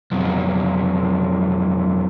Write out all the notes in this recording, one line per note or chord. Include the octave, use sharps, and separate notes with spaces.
B1 F2